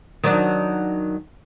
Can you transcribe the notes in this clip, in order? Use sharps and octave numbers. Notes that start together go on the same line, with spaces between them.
D#3 F#3 D4